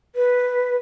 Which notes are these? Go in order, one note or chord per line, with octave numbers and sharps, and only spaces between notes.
B4